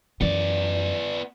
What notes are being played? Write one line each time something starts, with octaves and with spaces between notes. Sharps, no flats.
F#2 E3 B3 D5